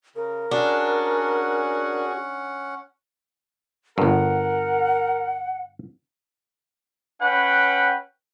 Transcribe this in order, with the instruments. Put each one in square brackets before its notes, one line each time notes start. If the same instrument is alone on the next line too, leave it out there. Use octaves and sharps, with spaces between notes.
[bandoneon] C#3 [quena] A#4
[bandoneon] C#4 F#5 [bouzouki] D4 [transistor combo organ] F#4 G#4
[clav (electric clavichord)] G1 G2 [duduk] A#4 [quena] F#5
[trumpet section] C#4 B4 F#5 G5